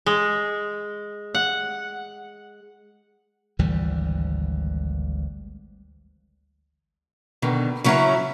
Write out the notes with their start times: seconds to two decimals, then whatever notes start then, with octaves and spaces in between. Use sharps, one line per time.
0.06 G#3
1.35 F#5
3.59 G#1 D2 E3 G3
7.42 B2 D3 D#3
7.84 C#3 F#3 C#4 E4 E5 A#5